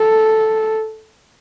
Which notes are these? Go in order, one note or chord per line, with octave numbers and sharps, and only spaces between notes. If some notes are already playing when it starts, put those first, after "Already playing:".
Already playing: A4